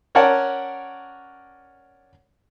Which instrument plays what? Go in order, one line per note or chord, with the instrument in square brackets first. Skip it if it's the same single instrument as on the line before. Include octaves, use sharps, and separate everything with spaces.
[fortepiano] C#4 A#4 C#5 D5 F#5 A5